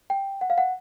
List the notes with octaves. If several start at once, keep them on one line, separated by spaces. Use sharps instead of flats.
G5
F#5
F5
F#5